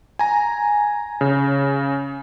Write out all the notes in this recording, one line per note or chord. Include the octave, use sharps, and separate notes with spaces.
G#5 A#5
C#3